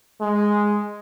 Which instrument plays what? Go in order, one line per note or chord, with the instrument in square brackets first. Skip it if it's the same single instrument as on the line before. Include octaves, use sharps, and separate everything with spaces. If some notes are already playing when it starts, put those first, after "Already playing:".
[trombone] G#3